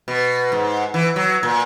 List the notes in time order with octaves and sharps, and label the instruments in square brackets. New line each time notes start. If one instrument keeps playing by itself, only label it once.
[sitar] B2
G#2
E3
F#3
A#2